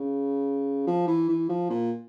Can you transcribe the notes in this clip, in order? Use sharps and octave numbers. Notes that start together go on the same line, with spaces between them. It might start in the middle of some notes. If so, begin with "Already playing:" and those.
Already playing: C#3
F3
E3
E3
F3
A#2